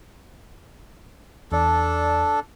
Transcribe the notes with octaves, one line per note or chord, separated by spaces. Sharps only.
E2 D4 A4 D5